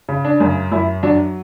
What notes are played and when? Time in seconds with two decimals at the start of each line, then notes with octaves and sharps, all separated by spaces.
0.09 C#3
0.25 D4
0.40 F#2
0.72 F#2 E4
1.03 F#3 D4